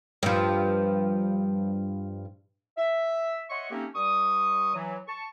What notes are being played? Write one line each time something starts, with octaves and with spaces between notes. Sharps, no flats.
G2 F3
E5
C#5 D#5 E5 F#5 C6 C#6
A3 A#3 C4 C#4 D#4 G4
G2 G3 C#6 D#6
E3 F#3
A5 C#6